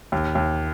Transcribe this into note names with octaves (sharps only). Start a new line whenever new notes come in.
D#2
D#2